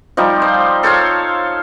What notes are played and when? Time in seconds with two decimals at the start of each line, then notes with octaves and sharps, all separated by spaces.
0.17 F3 G3 D#4
0.42 C5
0.83 A4 C5 C#5 F5